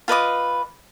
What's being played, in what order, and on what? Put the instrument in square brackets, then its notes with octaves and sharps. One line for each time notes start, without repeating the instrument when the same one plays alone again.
[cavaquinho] F4 B4 D#5 D6